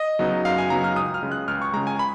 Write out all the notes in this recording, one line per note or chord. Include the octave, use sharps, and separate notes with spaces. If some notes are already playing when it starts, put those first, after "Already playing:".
Already playing: D#5
C#3 F#3 B3 D#4
F#2 F5
G#5
C#3 F#3 B3 D#4 A#5
F6
C#2 D#6
F6
C#3 G#3
F#6
C#2 F6
C#6
C#3 G#3 A#5
G#5
B5